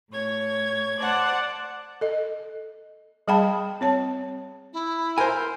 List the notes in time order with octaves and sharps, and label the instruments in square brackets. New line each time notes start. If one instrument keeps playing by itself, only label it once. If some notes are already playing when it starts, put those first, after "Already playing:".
[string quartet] A2 C#5 G#6
C5 D5 F#5 A5
[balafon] A4 D#5
G3 G#4 F5 G5 A5 B5
C4 C#5 A5
[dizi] E4
[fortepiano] A#4 C5 [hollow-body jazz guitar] G#5